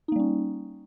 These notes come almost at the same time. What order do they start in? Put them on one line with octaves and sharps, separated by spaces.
D#4 A#3 G3 C#4